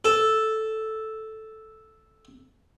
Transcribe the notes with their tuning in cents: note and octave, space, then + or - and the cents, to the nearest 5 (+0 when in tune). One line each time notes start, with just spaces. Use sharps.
A4 -5